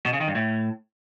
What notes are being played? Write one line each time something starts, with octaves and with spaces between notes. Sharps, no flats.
B2
C#3
D#3
G2
A2